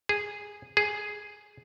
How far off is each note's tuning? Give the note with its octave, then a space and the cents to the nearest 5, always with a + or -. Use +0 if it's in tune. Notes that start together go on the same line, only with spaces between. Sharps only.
G#4 -5
G#4 +5